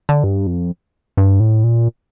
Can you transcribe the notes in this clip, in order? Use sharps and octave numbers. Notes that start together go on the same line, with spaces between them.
D3
G2
F2
G2
A2
A#2